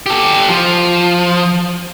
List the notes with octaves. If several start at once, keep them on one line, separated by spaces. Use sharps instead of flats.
G4 A4
F3